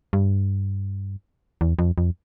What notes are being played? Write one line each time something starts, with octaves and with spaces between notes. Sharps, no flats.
G2
E2
F2
F2